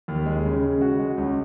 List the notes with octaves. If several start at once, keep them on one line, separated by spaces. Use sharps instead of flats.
D#2
G#3
C#3
C#3
F#4
G#3
C#2